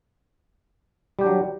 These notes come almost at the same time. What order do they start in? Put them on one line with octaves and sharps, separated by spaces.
G3 G4 D4 F#3